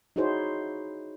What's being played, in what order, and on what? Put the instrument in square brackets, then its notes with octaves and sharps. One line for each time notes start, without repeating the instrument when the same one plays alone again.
[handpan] D#4 E4 F#4 G#4 C5 C#5